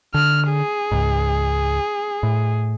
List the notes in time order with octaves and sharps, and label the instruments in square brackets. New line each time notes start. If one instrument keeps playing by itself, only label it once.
[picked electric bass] D3 [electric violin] F6
[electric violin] G#4
[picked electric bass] C#2 G#2
A2